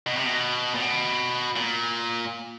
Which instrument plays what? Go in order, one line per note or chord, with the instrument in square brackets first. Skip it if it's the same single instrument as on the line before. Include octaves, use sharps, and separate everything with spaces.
[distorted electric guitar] B2
C3
B2
A#2
B2
A#2